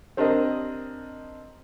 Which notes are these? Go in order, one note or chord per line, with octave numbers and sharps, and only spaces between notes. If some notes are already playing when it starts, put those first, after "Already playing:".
C4 D4 G4 A#4 D#5